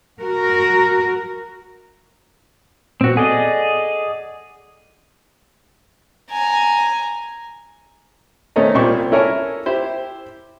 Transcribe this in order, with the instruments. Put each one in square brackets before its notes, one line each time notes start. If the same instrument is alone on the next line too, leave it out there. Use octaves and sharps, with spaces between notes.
[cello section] F#4 A#4
[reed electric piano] A#2 B3 [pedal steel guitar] C4 F#4
[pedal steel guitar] G#4 D5 D#5 [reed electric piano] A4 F#5 G#5
[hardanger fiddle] G#5 A#5
[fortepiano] D#3 A3 C4 C#4 D#4 A#5
C2 A#2 G4 C5 D5 C#6
C#4 E4 A4 A#4 C#5 G#5
E4 G4 C5